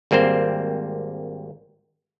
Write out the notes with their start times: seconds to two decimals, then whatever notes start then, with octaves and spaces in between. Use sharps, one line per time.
0.11 G#1 G3 A#3 C4 C5